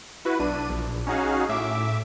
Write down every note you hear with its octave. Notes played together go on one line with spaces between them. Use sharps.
E4 F#4 B4
B1 D4 D#7
A#1
C#4 D#4 F#4 G#4 F5
A2 E5 D6